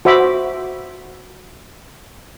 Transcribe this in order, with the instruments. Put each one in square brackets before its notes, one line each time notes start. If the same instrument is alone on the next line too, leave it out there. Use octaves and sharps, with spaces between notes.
[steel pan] F#4 C5 E5 B5 D6